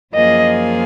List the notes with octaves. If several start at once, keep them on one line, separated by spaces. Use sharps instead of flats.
F#2 F3 A#3 F4 G#4 D#5